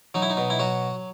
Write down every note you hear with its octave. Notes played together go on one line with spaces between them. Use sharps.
F#3 D#4
E4
D#4
B2
E4
F#3 F#4